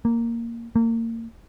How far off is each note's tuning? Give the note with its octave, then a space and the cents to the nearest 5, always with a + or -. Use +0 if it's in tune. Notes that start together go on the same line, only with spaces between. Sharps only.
A#3 -5
A#3 -30